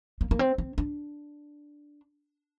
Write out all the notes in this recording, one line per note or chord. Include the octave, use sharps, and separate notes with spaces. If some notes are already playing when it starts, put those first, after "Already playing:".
A#3
A#3
C4
C4
D4